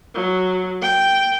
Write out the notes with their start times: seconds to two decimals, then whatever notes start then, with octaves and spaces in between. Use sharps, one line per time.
0.15 F#3
0.82 G5